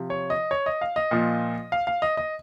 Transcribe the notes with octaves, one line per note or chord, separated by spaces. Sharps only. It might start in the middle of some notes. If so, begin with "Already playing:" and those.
Already playing: C3 F3
C#5
D#5
C#5
D#5
F5
D#5
A#2 F3
F5
F5
D#5
D#5